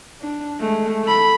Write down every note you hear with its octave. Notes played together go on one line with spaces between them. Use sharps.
D4
G#3 A3
A4 B5